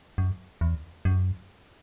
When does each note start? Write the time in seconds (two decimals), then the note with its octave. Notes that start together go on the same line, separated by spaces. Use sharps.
0.18 F#2
0.61 E2
1.05 F#2